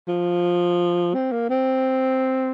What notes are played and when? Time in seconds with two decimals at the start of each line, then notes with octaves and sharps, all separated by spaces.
0.08 F3
1.14 C4
1.32 A#3
1.50 C4